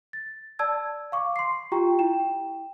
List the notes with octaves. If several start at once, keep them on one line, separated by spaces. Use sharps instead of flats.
A6
D5 A5 E6 G#6
F5 C#6 D6
C6 C7
F4 G4 G5 A#5 C#6
E4 G5 E7